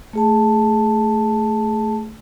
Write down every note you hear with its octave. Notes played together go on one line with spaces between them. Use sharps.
A3 G#4 A5